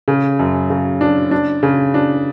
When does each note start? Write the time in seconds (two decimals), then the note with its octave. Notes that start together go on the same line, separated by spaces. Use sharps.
0.08 C#3
0.39 F#2
0.70 C#3
1.01 D4
1.31 D4
1.63 C#3
1.94 D4